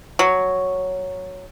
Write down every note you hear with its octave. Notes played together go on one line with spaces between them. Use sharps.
F#3